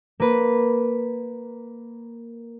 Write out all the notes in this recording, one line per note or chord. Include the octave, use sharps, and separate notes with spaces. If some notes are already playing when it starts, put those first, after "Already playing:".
A#3 B4